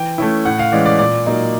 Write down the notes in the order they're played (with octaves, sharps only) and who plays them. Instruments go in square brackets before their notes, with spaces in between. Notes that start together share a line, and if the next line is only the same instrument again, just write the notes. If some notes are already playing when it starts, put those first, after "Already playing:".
Already playing: [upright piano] E3 G5
A3 C#4 E4
A2 F#5
F5
E3 G#3 C#4 D5
D5
A#2 D5
F#3 A#3 D#4